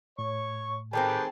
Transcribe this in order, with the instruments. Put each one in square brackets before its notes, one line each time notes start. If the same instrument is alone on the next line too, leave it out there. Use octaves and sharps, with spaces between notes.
[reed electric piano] A2 [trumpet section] C#5 [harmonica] C#6
[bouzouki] D#3 A3 C4 [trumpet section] G4 B4 G5 [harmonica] G#4 A5